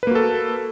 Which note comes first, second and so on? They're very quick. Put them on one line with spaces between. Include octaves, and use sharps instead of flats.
B4 A#3 F#4 A4